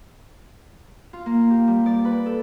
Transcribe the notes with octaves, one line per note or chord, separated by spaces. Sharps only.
F4
A#3
G4
G3
D5
B4
A4